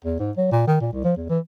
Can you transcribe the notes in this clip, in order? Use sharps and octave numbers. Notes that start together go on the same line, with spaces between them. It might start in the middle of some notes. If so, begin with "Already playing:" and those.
E2
G#2
F#3
A#2
D#3
A#2
C2
F3
E2
E3